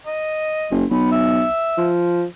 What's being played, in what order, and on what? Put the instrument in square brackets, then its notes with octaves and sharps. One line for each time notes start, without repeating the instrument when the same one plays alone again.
[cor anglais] D#5
[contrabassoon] F#1
[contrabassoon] B1 [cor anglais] B3
[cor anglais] E5
[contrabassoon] F3